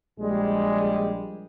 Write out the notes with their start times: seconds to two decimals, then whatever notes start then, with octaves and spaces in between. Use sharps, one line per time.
0.19 A#1 G3 G#3